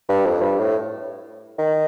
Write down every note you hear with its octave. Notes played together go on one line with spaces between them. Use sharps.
G2
F2
G2
A2
D#3